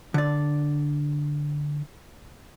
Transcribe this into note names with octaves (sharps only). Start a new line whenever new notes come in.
D3 D5